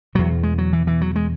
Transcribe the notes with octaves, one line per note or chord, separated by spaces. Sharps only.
E2 B2 F#3
G#3
F#3
E3
E3
F#3
G#3